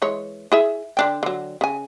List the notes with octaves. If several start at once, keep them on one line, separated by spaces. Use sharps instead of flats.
E3 G#3 C#5
E4 G#4 E5
D3 D4 G5
D3 F#3
C#3 G#5